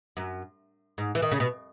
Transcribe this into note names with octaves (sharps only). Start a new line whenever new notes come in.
F#2
G#2
E3
D#3
C#3
B2